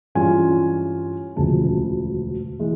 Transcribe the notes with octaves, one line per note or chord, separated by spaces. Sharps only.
G2 E3 G#3 C#4 F4 G#5
E1 D2 C#3 F3 G#3 A5
E3 G#3